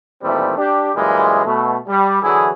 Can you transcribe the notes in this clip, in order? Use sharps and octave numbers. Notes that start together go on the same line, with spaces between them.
A#2 D#3 E3 G3 A3 C4
D4 G4
F#2 A#2 E3 G3 G#3
B2 A3
G3
D3 E3 F#3 E4 G#4